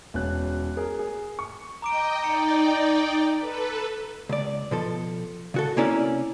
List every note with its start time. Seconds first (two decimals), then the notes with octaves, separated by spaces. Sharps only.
0.14 E1 C#4 F#6
0.77 G#4 A#4
0.99 G#4
1.39 C#6
1.82 D#5 G5 A#5 D6 D7
2.23 D#4 D5 G5 A#5 C#7
3.37 A4 B4
4.29 C#2 D5
4.71 B2 F3 A4
5.54 C#3 F#4 A4
5.77 C3 A#3 C#4 E4 D5